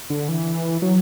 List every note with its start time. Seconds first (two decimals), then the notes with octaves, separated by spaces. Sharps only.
0.10 D3
0.29 E3
0.82 F#3